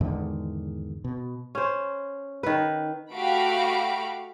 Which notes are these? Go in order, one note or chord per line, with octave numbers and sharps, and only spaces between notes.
E2 G#2 D3 D#3
B2
C#4 C5
D#3 B4
A3 F#4 G4 F5 B5 D7